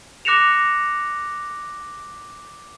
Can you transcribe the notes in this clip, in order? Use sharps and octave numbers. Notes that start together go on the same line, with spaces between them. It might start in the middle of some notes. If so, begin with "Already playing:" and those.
D6 F#6 A#6 C#7 E7 F7